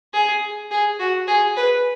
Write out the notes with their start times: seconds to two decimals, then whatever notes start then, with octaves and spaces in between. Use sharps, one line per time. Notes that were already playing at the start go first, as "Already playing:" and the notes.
0.13 G#4
0.71 G#4
0.99 F#4
1.28 G#4
1.56 B4